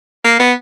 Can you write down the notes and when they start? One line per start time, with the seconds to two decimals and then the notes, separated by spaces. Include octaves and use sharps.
0.24 A#3
0.39 B3